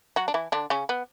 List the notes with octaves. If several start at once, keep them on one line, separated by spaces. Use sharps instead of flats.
F#3 F#4
D4
E3 E4
D3 D4
C#3 C#4
B3